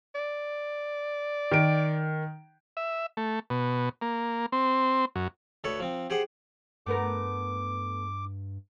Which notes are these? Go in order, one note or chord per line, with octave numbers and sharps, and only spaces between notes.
D5
D#3 D7
E5
A3
B2
A#3
C4
F#2
D2 A4 B4 C#5
F3 C4
G4 G#4 C5 F#5
G2 A3 B3 A#4 D6